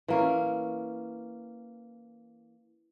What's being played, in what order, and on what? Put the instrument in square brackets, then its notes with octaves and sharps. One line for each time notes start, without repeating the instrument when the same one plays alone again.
[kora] E3 A#3 C#4